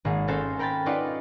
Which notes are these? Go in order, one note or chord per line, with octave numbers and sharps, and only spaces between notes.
G#1 A#3 G#4
C4 C#4 F#4 A4 A#4 C5
A#4 G5 B5 G6 A6
C#4 D#4 F4 B4 D5 F#5